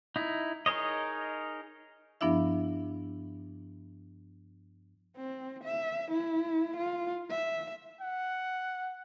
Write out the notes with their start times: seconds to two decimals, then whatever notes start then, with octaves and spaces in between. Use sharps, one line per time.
0.16 D#4 E4
0.66 D#4 G#4 A#4 C#5 D#5
2.21 G2 F3 B3 D4 E4 E5
5.17 C4
5.65 E5
6.12 E4
6.77 F4
7.30 E5
8.01 F#5